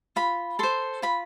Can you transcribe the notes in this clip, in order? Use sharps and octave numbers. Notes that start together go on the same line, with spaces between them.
F4 B5
A4 C5 C6
F4 B5